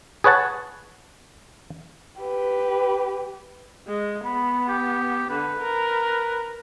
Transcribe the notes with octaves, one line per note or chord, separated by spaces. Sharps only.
G#4 B4 C#5 F#5 A5
G4 B4
G#3
B3 B5
G4
D3 B4
A#4